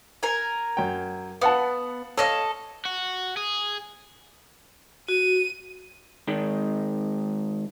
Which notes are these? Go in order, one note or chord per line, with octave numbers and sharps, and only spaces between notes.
A#4 G#5
F#2 G5
B3 F5 F#5 A5
A4 C#5 D#5 F5 F6
F#4
G#4
F#4 D#7
G#2 D#3 G#3